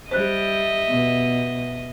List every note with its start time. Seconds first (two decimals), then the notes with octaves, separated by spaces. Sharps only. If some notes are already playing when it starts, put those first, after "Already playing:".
0.11 G3 C5 D#5 E5 F#6
0.88 B2